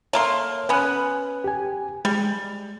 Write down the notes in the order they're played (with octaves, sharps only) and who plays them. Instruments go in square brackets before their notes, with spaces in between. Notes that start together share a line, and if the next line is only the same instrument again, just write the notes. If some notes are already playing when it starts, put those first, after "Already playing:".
[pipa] A3 A#3 C6 [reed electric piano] C#5
[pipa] B3 C#4 [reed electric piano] B4 G#5 F#6
[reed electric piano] G4 G#5
[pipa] G3 [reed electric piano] G#3